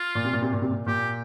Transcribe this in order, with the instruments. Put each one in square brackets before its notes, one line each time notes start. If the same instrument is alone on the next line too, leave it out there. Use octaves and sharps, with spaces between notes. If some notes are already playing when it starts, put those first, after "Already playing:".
Already playing: [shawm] F4
[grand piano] A#2
C3
A#2
C3
A#2
C3
A#2
[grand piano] A#2 [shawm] G4